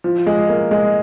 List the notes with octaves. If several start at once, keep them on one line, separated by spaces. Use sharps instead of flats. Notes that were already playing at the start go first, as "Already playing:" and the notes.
F3
G#3
A#3
G#3